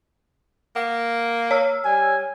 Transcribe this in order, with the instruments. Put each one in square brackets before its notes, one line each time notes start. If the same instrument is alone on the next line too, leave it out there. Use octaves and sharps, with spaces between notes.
[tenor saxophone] A#3 [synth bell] F#5
[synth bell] C#5 E6 F6
[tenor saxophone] G3 [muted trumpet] G#5